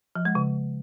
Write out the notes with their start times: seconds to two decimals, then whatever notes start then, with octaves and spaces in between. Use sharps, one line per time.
0.16 F3
0.25 G#3
0.35 C#3